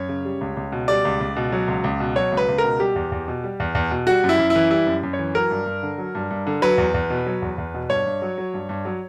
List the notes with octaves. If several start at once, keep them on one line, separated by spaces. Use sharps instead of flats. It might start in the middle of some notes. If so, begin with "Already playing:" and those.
Already playing: F#2 C#5
C#3
G3
C#2
C#2
B2
G3 D5
C#2
C#2
B2
F#3
C#2
C#2
B2
F#3 C#5
C#2
B4
C#2
A#4
B2
G3 G4
E2
E2
B2
G3
E2
E2
B2
G3 F#4
F#2
E4
F#2
E4
E3
G3 E4
F#2
F#2
C#5
E3
F#3 A#4
G2
G2
D3
F#3
G2
G2
D3
F#3 B4
E2
E2
B2
F#3
E2
E2
B2
G2 C#5
G2
F#3
F#3
G2
G2
F#3